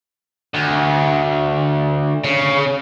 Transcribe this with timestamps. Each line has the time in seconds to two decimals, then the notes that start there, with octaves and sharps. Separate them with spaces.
0.54 D2
2.24 C#3